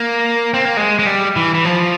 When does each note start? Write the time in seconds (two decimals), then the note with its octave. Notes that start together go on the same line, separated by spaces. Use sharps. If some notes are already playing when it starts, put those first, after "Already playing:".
Already playing: A#3
0.54 C4
0.65 A#3
0.77 G#3
0.99 G#3
1.06 G3
1.36 E3
1.55 E3
1.65 F3